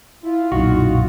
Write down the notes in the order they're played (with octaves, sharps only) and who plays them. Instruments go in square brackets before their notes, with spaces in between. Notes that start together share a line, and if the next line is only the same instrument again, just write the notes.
[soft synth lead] E4 [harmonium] F4
[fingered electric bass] B1 F#2 A#2 [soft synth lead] D#4 [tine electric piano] F#4